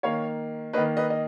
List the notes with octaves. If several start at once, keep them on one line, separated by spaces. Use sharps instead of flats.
D#3 A#3 C#5 F5
D#3 A#3 B4 D#5
B4 D#5
D#5